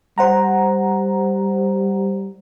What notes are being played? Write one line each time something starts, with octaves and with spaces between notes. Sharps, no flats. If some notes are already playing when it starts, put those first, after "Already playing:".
G3 C5 F#5 A#5